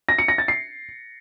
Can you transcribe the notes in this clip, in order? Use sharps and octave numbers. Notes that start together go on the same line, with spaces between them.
A#6
C#7
A#6
A6
C7